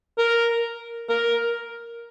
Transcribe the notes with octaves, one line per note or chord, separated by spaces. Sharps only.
A#4
A#4